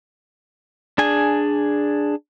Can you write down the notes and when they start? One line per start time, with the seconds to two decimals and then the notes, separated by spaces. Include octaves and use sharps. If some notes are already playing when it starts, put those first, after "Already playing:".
0.98 D4 G#4 G#5